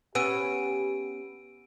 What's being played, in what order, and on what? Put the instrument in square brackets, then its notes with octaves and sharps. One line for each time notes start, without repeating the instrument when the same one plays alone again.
[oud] B3 C#4 [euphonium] G4 [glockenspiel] E6 D7 D#7